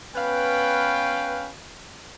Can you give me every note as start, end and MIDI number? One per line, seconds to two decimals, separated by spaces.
0.16 1.49 59
0.16 1.49 61
0.16 1.49 71
0.16 1.49 77
0.16 1.49 79